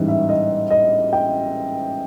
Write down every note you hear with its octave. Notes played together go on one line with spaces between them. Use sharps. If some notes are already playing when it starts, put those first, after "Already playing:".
Already playing: A1 G#2 E3 G3
E5
D#5
D#5
G5